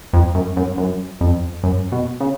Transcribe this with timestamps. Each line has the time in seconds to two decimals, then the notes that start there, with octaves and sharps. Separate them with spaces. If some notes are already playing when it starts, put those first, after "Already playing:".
0.13 F2
0.35 F#2
0.56 F#2
0.78 F#2
1.21 F2
1.64 F#2
1.92 B2
2.20 C#3